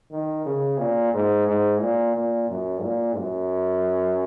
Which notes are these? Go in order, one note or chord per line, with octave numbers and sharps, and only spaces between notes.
D#3
C#3
A#2
G#2
G#2
A#2
A#2
F#2
A#2
F#2